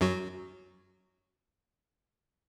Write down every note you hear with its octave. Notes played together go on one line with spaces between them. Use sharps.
F#2 F#3 F#4